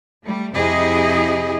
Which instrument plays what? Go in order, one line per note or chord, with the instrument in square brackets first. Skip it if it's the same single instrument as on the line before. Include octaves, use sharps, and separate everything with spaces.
[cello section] G3 A3
F2 C3 E4 G4 G#4 D#5